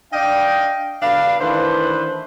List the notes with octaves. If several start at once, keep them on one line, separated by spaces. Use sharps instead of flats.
D4 D5 D#5 F5 G5
B2 D3 D4 B4 F5
D#3 E3 A3 D4 B4 C5